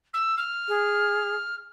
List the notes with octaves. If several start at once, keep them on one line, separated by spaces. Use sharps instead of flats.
E6
F6
G#4